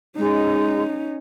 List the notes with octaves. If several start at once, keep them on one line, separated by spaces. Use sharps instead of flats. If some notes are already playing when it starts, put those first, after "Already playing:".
G#3 C#4 D#4